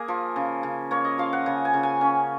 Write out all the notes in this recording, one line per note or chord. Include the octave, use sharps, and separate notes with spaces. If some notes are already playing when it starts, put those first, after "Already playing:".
Already playing: A#3 G#4
F3
C#3
C#3
A#3 C#5
D#5
F3 F5
F#5
C#3 G#5
G#5
C#3
G#5
C#4